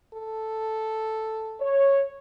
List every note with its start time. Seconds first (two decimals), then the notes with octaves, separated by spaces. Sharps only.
0.14 A4
1.60 C#5